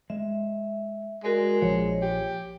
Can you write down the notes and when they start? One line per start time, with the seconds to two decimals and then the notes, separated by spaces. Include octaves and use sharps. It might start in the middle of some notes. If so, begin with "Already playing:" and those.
0.10 G#3 E5
1.24 G#3 F#4 A#4 D5
1.62 A#1 F3 C#5
2.02 G4